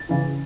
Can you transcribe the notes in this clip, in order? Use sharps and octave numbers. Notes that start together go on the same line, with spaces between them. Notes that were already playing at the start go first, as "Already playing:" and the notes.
Already playing: A6
C#3 E3